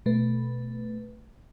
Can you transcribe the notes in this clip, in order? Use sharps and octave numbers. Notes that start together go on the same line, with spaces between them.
B2 A3 B4